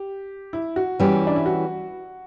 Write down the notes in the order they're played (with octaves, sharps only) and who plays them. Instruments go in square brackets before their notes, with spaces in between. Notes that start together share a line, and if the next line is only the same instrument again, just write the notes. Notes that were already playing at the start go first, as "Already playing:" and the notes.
Already playing: [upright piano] G4
E4
F#4
[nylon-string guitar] E3 G3 C#4 G4
[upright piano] D4
E4
F#4